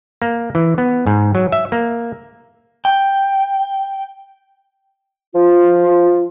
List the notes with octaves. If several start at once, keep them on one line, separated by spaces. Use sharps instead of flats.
A#3
E3
B3
G#2
F#3
E5
A#3
G5
F3 F4